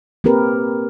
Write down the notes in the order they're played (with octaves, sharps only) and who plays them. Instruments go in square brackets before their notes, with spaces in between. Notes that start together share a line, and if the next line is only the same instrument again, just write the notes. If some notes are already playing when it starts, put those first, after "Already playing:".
[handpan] A#3 C4 G4 A#4 B4